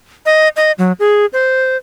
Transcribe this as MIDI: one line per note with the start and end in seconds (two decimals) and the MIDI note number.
0.26 0.48 75
0.56 0.72 75
0.78 0.92 54
1.00 1.26 68
1.33 1.77 72